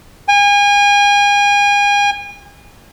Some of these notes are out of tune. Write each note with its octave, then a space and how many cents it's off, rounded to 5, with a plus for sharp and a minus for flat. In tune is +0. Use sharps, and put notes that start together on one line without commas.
G#5 -35